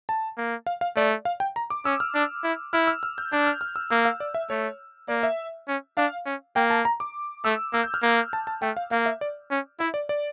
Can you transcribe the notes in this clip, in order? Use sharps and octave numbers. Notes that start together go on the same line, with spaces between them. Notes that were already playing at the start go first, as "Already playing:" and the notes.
A5
A#3
F5
F5
A3 D5
F5
G5
A#5
D6
C#4 E6
F6
D4
E4
E4 F6
E6
F6
G6
D4 G6
F6
F6
E6
A#3 E6
F5
D5
E5
A3 C#5
A#3 D5
E5
C#4
D4 F5
C#4
A#3 G5
A5
A#5
D6
A3 E6
A#3 E6
G6
F6
A#3
A5
A5
A3 G5
F5
A#3 F5
E5
D5
C#4
E4 E5
D5
D5